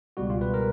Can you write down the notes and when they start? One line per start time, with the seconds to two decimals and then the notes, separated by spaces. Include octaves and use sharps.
0.17 C#2 B2 G3 F#4
0.30 F4
0.41 B4
0.54 A#4